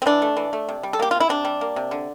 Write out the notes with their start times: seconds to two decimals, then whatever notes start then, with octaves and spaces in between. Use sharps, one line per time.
0.02 C4
0.06 E3 D4
0.22 A3
0.37 E3
0.53 A3
0.69 C3
0.83 G3
0.93 A4
0.99 A#3 G4
1.11 C3 F4
1.20 E4
1.29 C3 D4
1.45 G3
1.61 A#3
1.76 C3
1.91 D3